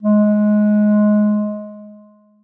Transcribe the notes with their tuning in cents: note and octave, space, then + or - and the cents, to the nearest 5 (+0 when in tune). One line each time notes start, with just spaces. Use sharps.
G#3 +15